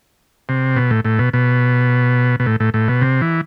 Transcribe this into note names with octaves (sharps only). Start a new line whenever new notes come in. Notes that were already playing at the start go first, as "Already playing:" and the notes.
C3
B2
A2
A2
B2
B2
B2
A2
A2
A2
B2
C3
E3